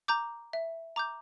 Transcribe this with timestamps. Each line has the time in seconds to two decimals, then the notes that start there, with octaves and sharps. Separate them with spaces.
0.08 A#5 D6 G6
0.53 E5
0.96 A#5 D6 G6